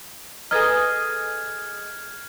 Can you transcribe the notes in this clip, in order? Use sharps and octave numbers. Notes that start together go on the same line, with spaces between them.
G#4 A4 B4 D#5 A#5 F6 G#6